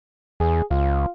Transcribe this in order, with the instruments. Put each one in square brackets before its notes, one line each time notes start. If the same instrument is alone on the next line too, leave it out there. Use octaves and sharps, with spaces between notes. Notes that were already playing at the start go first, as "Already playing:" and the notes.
[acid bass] E2 [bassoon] G#4
[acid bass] C#2 [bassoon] F4